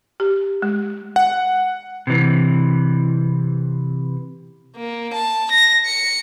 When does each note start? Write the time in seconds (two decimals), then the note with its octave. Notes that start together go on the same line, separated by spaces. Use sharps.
0.20 G4
0.62 G#3
1.16 F#5
2.07 C3 E3
4.77 A#3
5.13 A5
5.51 A#6
5.86 C#7